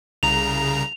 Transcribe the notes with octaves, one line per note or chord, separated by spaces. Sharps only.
C2 C#3 A#5 F7